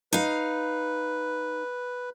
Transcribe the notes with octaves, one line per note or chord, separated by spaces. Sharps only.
D#4 B4 F5